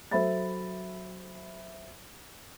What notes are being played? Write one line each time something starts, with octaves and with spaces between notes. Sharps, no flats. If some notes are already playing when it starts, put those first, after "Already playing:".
F#3 A4 C5 E5 B5 A6